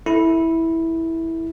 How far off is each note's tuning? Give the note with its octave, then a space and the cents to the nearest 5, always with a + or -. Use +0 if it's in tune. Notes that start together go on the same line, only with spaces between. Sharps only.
E4 -10 A4 +0